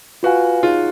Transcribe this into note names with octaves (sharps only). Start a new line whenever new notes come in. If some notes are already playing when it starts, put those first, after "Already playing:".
F4 F#4 B4 F5 G#5
D#4 F4 G#4 C#5